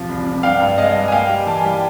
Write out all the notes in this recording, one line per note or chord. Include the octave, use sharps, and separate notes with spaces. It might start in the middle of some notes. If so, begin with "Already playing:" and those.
Already playing: E1 C3 F3
C2
C3
G2 F5 G5
G2
G#3 D#5 F5
G2
G#5
A#3 F5 G5
G3
E3 A5
G#5
G3 G5